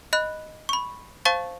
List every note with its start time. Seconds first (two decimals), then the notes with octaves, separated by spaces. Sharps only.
0.13 D#5 B5 F#6
0.69 B5 C#6
1.25 C5 F5 A5 C#6 A6